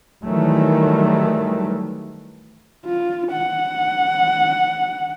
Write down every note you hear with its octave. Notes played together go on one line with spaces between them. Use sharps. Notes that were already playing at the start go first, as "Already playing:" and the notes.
D#3 E3 F#3 G3 A3
F4
F#5